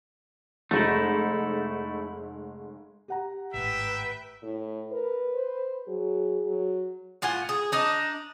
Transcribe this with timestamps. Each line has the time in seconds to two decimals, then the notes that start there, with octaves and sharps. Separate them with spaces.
0.71 F1 G#3 A3 D#4 E4
3.08 G4 F#5 A#5
3.54 G#1 A2 B4 E5 G5
4.43 A2
4.92 A#4 B4
5.34 C5
5.88 F#3 G#4
6.46 F#3
7.22 A2 F4 F#5 G#5
7.49 G#4
7.72 D4 D#4 D#5